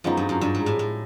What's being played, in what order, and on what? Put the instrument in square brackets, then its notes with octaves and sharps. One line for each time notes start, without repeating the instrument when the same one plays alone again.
[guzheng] F#2 [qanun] F3 G#3 B3 D#4
[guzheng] G2
F#2
G2
G#2
A2
A2